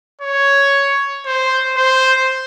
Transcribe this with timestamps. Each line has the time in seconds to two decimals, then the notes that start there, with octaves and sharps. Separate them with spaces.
0.22 C#5
1.26 C5
1.77 C5